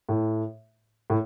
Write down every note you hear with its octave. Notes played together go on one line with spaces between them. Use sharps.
A2
A2